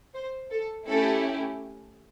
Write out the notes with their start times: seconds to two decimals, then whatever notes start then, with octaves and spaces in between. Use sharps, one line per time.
0.14 C5
0.51 A4
0.87 A3 C#4 E4 G4 A4